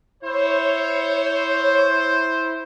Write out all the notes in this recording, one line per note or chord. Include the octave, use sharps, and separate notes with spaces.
E4 C5 C#5